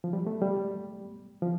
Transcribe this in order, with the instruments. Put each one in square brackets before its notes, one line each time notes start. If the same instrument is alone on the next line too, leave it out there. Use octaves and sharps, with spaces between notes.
[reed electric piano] F3
G3
A3
G3
F3